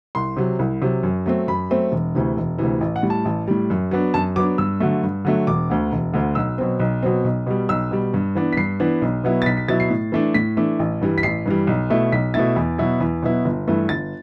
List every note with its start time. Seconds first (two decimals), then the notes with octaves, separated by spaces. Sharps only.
0.15 C2 C6
0.37 C3 F#3
0.59 C2
0.82 C3 F#3
1.03 F#2
1.26 F#3 A3 C4
1.48 F#2 B5
1.70 F#3 A3 C4
1.92 E1
2.15 D2 C3 E3
2.37 E1
2.59 D2 C3 E3
2.81 A1
2.96 F#5
3.03 A2 G3
3.10 A5
3.25 A1
3.48 A2 G3
3.70 F#2
3.91 F#3 B3 D4
4.14 F#2 A5
4.36 F#3 B3 D4 D6
4.58 G2 E6
4.80 D3 F#3 A3
5.03 G2
5.25 D3 F#3 A3
5.47 E1 D6
5.70 D2 D3
5.92 E1
6.14 D2 D3
6.35 B1 E6
6.58 B2 F#3 C4
6.80 B1
7.03 B2 F#3 C4
7.24 B1
7.47 B2 G3
7.69 B1 E6
7.91 B2 G3
8.14 G2
8.35 E3 B3 D4
8.53 B6
8.57 G2 C7
8.80 E3 B3 D4
9.02 B1
9.24 B2 F#3 B3 E4
9.42 A6
9.46 B1 B6
9.57 B6
9.68 B2 F#3 B3 E4 A6
9.80 C7
9.90 A2
10.12 E3 A3 D4
10.34 A2 B6
10.57 E3 A3 D4
10.79 A1
11.01 G2 E3 G3
11.18 B6
11.23 A1 C7
11.46 G2 E3 G3
11.67 B1
11.90 B2 A3 E4
12.12 B1 B6
12.34 B2 A3 E4 A6
12.56 E2
12.78 B2 F#3 B3 E4
13.00 E2
13.23 B2 F#3 B3 E4
13.45 G1
13.68 G2 E3 A3
13.89 G1 A6